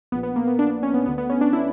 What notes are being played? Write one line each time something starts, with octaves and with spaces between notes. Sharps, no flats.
A#1 A#2 B3
B3
A#3
B3
D4
D4
C#4
B3
D2 D3 B3
B3
C#4
D4
E4